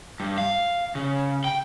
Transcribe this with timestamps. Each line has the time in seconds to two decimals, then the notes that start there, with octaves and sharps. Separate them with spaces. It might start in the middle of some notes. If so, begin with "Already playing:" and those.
0.20 G2
0.38 F5
0.95 C#3
1.44 G5